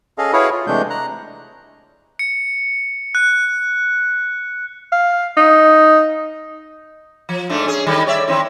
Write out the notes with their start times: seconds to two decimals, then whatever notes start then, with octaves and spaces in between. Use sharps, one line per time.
0.18 C#4 G#4 A4 D#5 F5
0.33 E4 F#4 G#4 B4 C#5 F5
0.52 F4
0.67 C3 E3 G#3 A3 D4 G6
0.90 A#5 F#6
2.19 C#7
3.15 F#6
4.92 F5
5.37 D#4
7.29 F3
7.50 G#2 A3 D4
7.66 C#4 G#4
7.87 D#3 G3 A4
8.07 C#5 D5 E5
8.27 D#3 C4 E4